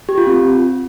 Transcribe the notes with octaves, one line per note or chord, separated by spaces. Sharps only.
G4
F4
C4